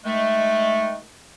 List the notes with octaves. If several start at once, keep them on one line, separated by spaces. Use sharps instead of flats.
D#3 G#3 A3